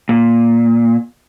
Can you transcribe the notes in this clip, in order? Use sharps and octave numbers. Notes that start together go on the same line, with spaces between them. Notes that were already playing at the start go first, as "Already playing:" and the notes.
A#2